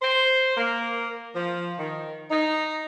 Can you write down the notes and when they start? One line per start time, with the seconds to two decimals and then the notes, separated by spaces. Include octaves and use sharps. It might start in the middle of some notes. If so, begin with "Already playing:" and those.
0.02 C5
0.57 A#3
1.36 F3
1.79 D#3
2.31 D#4